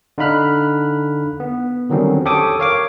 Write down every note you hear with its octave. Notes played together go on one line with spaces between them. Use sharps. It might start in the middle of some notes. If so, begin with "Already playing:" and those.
D3 D#4 F5 B5 F6 F#6
B3
D3 D#3 F#3 G3 C4 C#4
G4 A4 C#5 G5 D6 D#6
A#4 C#5 F5 D6